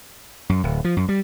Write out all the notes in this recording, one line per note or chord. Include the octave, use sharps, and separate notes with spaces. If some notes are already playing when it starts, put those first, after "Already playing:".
F#2
D1
F3
F#2
G3